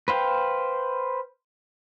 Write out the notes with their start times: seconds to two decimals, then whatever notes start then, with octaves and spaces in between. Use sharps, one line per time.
0.08 B4 C5 F5 G5